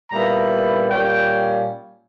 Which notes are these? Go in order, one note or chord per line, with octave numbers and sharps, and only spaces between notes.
A#2 G3 B3 E4 A#5
A#2 G3 C#4 G5